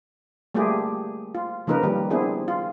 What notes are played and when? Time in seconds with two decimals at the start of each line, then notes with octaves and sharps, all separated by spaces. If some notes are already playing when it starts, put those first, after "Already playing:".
0.55 G3 A3 A#3 F4 G4 G#4
1.35 F4
1.67 C#3 F3 A#3 D#4 A#4 B4
1.83 D#3 G3
2.10 B3 C4 D4 E4 G#4
2.48 F4